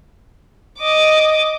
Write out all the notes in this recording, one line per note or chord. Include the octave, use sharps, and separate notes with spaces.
D#5 D6